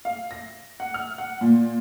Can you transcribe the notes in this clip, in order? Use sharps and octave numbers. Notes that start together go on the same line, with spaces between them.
F5
A#6
F#5
F6
F#5
A#2